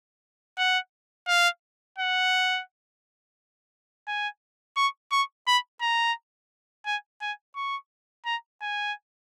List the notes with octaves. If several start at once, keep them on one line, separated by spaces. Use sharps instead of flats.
F#5
F5
F#5
G#5
C#6
C#6
B5
A#5
G#5
G#5
C#6
A#5
G#5